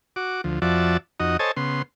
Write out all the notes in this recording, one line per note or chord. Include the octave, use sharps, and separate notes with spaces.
F#4 D6
D2 F3
F2 F3 F#4 D5 E5 A5
F2 D#4 F#4 D#5
A4 C5 C#5 D#5 G#5 A5
C#3 B3 C6